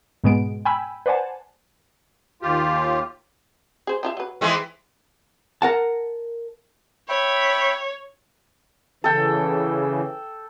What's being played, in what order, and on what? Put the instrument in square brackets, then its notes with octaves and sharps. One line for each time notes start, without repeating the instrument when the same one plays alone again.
[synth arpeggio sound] G#2 B2 G#3 B3 D7
G5 G#5 B5 E6
B4 C5 D5 F#5 G#5 A5
[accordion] D#2 F4 G4
[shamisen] G#4 C5
C4 F4 E5
F#3 B4
[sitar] E3 G#3 C4
[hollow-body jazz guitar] A#4 F#5 A5
[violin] C#5 [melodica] E5 G5 B5
[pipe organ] C#3 E3 [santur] A4 G5